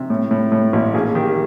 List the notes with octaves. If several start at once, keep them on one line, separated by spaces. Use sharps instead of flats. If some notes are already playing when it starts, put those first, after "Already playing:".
Already playing: C3
A2
A2
A2
A1
A#1 G#4
D#3 G4